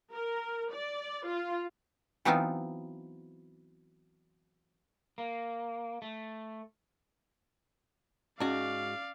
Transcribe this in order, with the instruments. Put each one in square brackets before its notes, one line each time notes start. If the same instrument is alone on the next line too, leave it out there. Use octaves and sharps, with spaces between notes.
[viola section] A#4
D5
F4
[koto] E3 F#3 B3 C4 D#4 F4
[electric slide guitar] A#3
A3
[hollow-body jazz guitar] G#2 F#4 [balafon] C#4 [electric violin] D5 F5